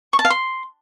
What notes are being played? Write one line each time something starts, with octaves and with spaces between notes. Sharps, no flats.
C#6
A5
F5
C6